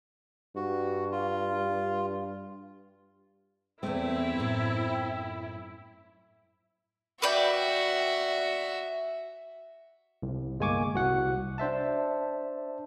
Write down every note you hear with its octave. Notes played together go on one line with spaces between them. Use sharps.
G2 F#4
F4
E2 A3 C4 E4
F#2 A2
F#4 B4 D5 E5 G5
C2
G1 G#3 A#3 G#5 C#6 D6
C2 F#4 F#5
D4 C5 E5 A5